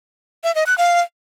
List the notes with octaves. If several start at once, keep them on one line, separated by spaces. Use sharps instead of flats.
E5
D#5
F#6
F5